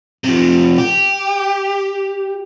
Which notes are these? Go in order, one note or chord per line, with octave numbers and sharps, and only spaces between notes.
C3 F3
G4